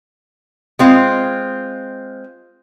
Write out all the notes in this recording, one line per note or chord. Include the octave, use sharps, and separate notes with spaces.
G#3 C4 F4